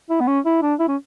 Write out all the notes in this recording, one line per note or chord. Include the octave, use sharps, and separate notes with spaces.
E4
B3
C#4
E4
D4
E4
C#4